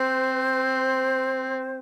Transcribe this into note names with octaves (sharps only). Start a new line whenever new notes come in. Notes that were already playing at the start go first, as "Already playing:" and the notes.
Already playing: C4 C5